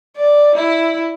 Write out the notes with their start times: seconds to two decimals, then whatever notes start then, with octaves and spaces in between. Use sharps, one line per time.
0.17 D5
0.55 E4